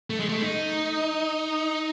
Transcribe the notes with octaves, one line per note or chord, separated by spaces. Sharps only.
A3
G#3
A3
D#4